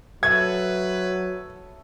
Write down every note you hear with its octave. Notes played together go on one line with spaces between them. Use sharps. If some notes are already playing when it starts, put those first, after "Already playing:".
F#3 A4 B4 C#5 E5 G#6